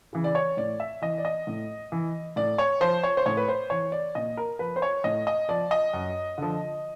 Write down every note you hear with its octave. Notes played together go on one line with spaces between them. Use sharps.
C#3 E3
D5
C#5
A2 D5
E5
E3 D#5
D5
D#5
A2
E3
A2 D5
C#5
F3 C5
C#5
C5
A2 C#5
B4
C5
E3 C#5
D5
A#2 D#5
A#4
F3 B4
C5
C#5
A2 D#5
D#5
F3 D5
D#5
F#2
D3 F3